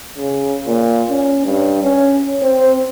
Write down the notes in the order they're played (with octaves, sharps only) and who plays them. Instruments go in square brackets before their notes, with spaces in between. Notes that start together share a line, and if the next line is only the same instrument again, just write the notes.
[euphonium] C#3
A#2
C#4
G2
C#4
C4